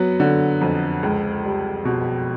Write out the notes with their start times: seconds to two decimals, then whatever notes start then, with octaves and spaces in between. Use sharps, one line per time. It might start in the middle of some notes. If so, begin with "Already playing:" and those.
Already playing: F#3 B3
0.20 D3
0.61 F2
1.03 C#2
1.44 G3
1.85 B2